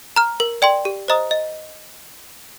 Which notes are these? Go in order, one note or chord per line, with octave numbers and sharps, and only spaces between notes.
A#5 F6
A#4
D5 G5 C6
G4
C5 D#5 A#5 D#6
D#5